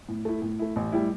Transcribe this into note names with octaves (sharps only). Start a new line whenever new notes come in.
A2
A3 E4
A2
A3 E4
A1
A2 G3 E4